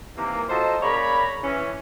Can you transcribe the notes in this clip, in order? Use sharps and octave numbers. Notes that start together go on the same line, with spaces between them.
C3 D#3 E3 A#3
F#3 F4 A4 C5 D#5
C#3 A#3 C#5 D5 A#5 B5
E3 C#4